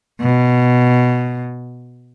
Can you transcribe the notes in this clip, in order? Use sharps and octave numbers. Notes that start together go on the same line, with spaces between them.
B2